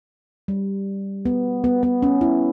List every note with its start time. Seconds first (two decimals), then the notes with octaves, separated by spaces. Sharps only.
0.48 G3
1.25 B3
1.64 B3
1.83 B3
2.03 C#4
2.21 E4